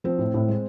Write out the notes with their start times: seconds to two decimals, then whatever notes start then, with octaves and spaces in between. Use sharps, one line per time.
0.04 F3 C4
0.19 A2
0.34 A2
0.49 G#3